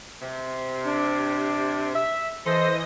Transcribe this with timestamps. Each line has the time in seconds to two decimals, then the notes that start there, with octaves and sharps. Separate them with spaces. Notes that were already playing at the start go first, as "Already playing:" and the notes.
0.21 C3
0.84 D4
1.95 E5
2.45 E3 A4 C5 D#5 C6 A#6